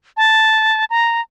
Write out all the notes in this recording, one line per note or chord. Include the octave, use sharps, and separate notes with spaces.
A5
A#5